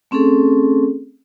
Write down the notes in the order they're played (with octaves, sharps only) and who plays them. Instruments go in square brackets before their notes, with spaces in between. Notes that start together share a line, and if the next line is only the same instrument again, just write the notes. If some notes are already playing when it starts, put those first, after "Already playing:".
[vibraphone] A3 C4 C#4 G#4 A4